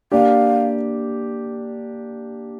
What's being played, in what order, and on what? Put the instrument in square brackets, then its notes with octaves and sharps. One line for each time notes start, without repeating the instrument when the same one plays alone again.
[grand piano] A#3 D4 G4 [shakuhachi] F5